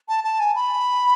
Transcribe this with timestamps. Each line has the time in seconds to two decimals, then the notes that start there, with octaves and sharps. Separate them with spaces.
0.08 A5
0.24 A5
0.40 G#5
0.55 B5